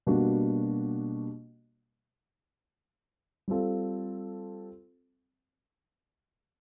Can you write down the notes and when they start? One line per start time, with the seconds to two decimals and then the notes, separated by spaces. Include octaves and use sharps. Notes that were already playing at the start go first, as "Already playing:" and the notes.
0.07 B2 G3 A#3 D4 F#4
3.48 G3 C4 F4 A4